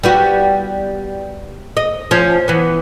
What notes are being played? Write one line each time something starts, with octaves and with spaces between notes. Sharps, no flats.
G3 B3 F#4
D#5
F3 C#4
E3 B3